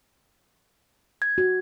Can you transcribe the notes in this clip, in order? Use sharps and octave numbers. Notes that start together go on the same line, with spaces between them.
G#6
F#4